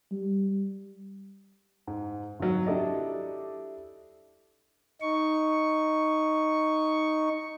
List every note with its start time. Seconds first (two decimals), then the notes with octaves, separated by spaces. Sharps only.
0.12 G3
1.88 G#2
2.40 G#1 F#3
2.67 D4 E4 G4 A4 D5 D#5
5.01 D#4 C#6